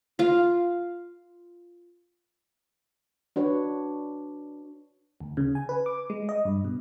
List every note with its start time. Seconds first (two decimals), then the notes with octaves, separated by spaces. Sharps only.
0.19 F4 F5
3.36 D4 F#4 B4 C#5
5.20 D2
5.37 C#3
5.55 G#5
5.69 B4
5.86 D6
6.10 G#3
6.29 D#5
6.45 G2
6.65 B2